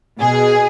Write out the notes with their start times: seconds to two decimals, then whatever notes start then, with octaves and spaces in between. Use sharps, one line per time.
0.20 B2 G#4